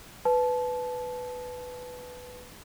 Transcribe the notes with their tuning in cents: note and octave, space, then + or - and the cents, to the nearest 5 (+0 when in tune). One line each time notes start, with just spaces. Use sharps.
B4 +10 A5 -25